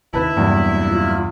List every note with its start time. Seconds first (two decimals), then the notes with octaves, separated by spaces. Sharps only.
0.14 D#2 C3 D#3 E4 B4 A5
0.37 E2 G2 C3 F#3 A#3
0.91 F4